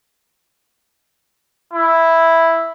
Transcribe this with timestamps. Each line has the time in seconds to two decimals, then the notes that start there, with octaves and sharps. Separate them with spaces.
1.73 E4